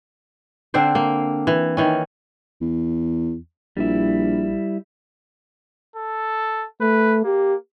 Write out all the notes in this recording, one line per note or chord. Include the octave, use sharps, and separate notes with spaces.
D3 C4 D4 C5
A#3
E3
D#3 E3 C#4
E2
A#1 G3 E4
A4
A3 B4
A#3 G4